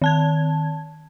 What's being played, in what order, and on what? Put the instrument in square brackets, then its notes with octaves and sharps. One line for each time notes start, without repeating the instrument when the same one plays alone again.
[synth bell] D#3 A5 G#6